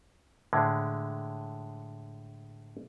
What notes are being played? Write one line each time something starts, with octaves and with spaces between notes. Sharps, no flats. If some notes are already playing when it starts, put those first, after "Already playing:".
A2 D3 G#3